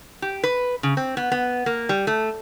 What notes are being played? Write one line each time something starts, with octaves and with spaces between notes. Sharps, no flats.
G4
B4
C#3
C4
B3
B3
A#3
G3
A3